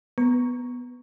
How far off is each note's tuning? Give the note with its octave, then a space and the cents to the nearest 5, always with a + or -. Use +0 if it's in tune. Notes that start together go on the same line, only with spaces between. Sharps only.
B3 +0 A#5 +0 C#6 +5